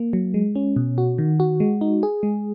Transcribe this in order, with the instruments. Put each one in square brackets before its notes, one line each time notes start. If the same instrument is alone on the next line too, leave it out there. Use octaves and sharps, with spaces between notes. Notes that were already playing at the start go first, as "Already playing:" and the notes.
Already playing: [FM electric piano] A#3
F#3
G#3
C#4
B2
F#4
D#3
F#4
G#3
D#4
G#4
G#3